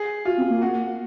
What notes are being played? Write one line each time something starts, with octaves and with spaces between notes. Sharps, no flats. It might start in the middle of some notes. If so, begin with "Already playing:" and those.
Already playing: G#4
F4 F#4
C4
A#3
F#4